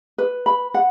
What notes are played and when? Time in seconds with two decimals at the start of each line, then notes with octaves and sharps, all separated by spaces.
0.18 B4
0.46 B5
0.74 F#5